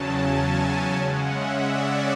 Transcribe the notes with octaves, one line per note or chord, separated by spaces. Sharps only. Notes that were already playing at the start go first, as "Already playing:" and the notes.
Already playing: E2 C#3 F#3 C#4 A5
G#5
C#3 G#3 C#4 F#5
E5
D5